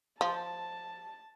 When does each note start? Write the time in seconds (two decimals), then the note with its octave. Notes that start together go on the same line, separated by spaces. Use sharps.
0.21 F3 A5